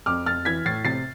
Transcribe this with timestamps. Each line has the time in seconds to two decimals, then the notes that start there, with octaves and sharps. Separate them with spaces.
0.06 F2 D6 F6
0.26 F2 F6 A6
0.45 E3 G#6 B6
0.66 A2 A6 C7
0.85 C3 A6 C7